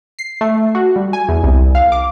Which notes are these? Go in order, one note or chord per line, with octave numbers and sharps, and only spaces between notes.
C7
A3
F#4
G3
G#5
E2
C2
F5
D6